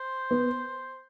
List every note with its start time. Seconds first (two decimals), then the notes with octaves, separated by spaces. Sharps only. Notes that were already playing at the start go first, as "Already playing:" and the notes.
Already playing: C5
0.31 B3